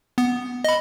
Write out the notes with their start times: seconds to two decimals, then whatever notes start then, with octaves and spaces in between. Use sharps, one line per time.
0.18 B3
0.64 D#5 B5